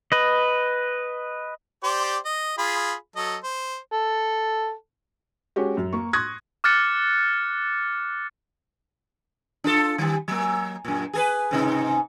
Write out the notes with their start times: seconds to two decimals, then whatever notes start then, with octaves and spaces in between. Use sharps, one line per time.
0.12 B4 D#5
1.84 G4 C5 D5
2.25 D#5
2.58 F4 G#4 B5
3.16 F#3 A4 D#5
3.43 C5
3.92 A4
5.56 G#3 C#4 F#4 G4
5.77 F#2
5.92 A#3 C#6
6.13 C6 C#6 D#6 F#6 G#6 A#6
6.64 D6 F6 F#6 A6 C#7
9.64 D4 F4 A4
9.98 D#3 G3
10.28 F#3 A#3
10.85 F#2 A#2
11.14 G#4 A4 B4
11.51 G#2 C3 D#4